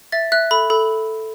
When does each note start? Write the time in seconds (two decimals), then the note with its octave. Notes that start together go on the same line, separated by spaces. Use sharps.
0.12 E5 A6
0.32 E5 F#6
0.51 A4 B5
0.70 A4 B5